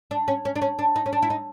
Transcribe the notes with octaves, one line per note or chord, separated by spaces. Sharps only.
D4
C#4
C#4
D4
C#4
D4
D#4
C#4
D4
E4
D#4